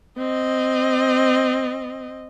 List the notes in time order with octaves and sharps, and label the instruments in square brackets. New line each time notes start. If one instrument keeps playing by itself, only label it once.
[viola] C4 D#5